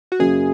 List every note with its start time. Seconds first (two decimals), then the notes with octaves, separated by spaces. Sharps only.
0.12 F#4
0.19 F#2 C#3 F#3 A#3 G#4